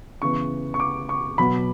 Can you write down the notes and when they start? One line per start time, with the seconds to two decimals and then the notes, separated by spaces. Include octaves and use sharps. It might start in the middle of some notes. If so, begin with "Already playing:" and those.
0.22 C#3 E3 B3 C#6
0.74 C#6
0.80 D6
1.09 C#6
1.38 B2 F#3 B3 B5